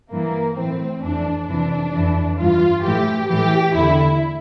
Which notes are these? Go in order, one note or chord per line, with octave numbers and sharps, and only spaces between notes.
G2 E3 A#3
A2 E3 C4
F2 E3 D4
F2 C3 E3 D4
F2 E3
G2 E3 F4
A2 E3 G4
A2 E3 G4
E2 D3 E4